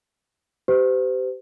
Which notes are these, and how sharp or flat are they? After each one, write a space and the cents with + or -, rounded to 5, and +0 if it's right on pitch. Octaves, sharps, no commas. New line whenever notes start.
G4 -20 C5 -40